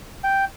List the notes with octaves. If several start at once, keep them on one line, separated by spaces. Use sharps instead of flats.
G5